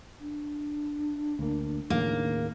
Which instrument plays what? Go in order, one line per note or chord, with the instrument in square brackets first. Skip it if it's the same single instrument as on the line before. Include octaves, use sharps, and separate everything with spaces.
[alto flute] D4
[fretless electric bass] D2 A#3
[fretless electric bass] D#2 A2 C#3 [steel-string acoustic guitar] A#3